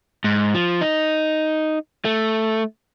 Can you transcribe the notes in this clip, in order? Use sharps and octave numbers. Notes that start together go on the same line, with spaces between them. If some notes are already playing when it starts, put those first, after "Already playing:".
G#2
F3
D#4
A3